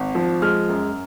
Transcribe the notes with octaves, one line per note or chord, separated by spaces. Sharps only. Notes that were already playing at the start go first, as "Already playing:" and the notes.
Already playing: G#1
F3
G#3 F6
F#2